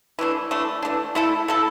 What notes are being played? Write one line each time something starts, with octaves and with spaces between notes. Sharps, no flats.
E3 A3 D4
E3 A3 D4
E3 A3 D4
A3 E4 A4
A3 E4 A4